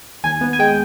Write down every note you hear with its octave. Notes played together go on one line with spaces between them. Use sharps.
D#2 G#5
B3
G#5
G#3 G5